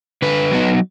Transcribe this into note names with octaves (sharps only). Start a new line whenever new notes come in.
D3 B4
F#3 B3 D#4